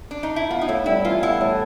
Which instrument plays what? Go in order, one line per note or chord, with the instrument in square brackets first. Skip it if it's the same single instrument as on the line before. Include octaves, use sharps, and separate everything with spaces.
[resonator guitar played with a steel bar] D4
D#4
E4
[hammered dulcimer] B3 [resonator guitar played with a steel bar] F4
[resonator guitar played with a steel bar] D#4
[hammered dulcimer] A2 [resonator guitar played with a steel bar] E4
[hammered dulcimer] G3 [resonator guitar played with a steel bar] E4
[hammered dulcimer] E3 [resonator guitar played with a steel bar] F4
[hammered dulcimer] B3 [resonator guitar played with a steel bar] E4
[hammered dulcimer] A2